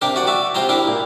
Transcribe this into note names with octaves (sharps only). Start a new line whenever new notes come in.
C3 D4 G4 A#4
F#4 D5 F#5
F#4 E5 D6
C3 F4 C5 G5 A#5
D4 E4 G4 A#4
A#2